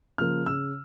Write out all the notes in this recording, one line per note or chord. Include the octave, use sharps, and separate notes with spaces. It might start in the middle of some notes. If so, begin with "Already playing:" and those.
C#3 F3 A#3 F6
C#3 E6